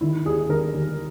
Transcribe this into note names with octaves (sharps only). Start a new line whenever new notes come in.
D#3 E4
D#2 G#4
D#2 A#4
D#2